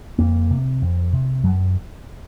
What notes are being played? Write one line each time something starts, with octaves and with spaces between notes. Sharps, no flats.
F2 A#3
C3
F2
C3
F#2 F#3